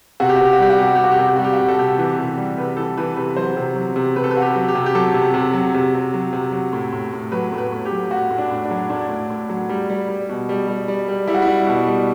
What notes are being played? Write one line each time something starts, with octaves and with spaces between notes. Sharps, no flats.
C3 F#4
G4
F#4
C3 G4
F#4
G3 G4
F#4
C3 G4
F#4
G4
C3
F#4
G4
C3 F#4
G4
G3 F#4
G4
F#4
C3
A4
C3 G4
E3
C3
G3
C3 B4
E3 A4
E3 B4
C3 B4
F#3 C5
C3
F#3
C3
C3 B4
A4
B4
C3 F#4
G4
F#3
G4
C3
G4
F#3 A4
C3
C3
F#3
C3
C3
F#3
C3
F#3
A2
A2
A2
F#3 B4
A2
B4
A2
G4
F#3
A2 F#4
A2
D4
A2
D4
F#3
A2 D4
A2
A2
F#3
G3
G3
G3
B2
G3
G3
G3
G3
G3 E4
F#4
G3 E4
B2
G3